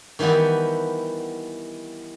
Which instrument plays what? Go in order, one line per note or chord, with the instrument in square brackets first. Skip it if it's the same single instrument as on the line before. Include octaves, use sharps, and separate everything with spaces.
[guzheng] D#3 E3 G3 B3 E4